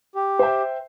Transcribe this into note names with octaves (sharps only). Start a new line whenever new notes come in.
G4
C5 E5 G5